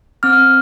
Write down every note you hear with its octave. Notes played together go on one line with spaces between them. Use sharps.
C4 F6